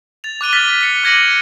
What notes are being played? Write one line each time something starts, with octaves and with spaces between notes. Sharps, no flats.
A6 F7
D6 F#6 D#7 G7
D6 F6 A6 B6 G7
B6 C#7
D6 G#6 A#6 C#7 D#7 F#7